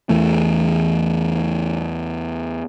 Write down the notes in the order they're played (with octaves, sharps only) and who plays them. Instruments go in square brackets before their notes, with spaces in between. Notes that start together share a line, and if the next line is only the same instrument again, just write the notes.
[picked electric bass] E2 E3 A3